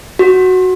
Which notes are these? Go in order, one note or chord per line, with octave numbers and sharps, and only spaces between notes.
F#4